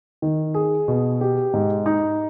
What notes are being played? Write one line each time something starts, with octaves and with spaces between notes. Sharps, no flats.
D#3
G#4
B2
G4
G#2
D#4